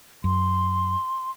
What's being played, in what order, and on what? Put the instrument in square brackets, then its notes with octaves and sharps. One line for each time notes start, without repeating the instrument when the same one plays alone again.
[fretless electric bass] F#2 [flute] C6